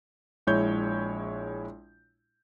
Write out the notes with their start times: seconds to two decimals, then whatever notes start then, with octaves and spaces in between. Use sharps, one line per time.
0.47 A#1 G#3 E4 C#5 G6